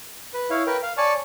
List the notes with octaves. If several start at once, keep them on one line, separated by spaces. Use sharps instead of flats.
B4
E4 C#5 F5
A#4 B4 G5
F5
C#5 D5 G#5 A5 C#6